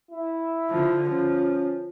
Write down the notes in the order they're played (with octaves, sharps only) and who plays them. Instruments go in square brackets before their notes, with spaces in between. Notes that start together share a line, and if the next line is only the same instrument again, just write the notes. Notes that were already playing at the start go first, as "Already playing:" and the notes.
[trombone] E4
[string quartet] D3 F3
[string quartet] F3 [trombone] C#4